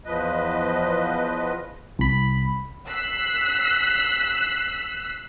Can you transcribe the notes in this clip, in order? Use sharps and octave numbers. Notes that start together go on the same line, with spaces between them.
E2 F3 B4 D#5
C2 B5
E6 F#6 B6 C7